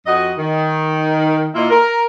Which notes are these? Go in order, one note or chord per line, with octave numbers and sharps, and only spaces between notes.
F2 F#4 D#5
D#3
A#2 A#3 E4 F4 D#5
A#4